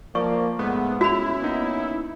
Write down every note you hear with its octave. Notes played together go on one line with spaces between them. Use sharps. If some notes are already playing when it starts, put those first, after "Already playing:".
F3 A#3 D5 C#6
G#2 A3 B3
C#4 E4 F#4 B5
A#3 B3 D#4